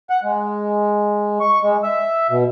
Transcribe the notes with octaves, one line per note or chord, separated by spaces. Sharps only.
F#5
G#3
C#6
G#3
E5
B2